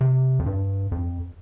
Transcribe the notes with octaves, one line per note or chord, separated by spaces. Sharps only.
C3
F2
G2
F2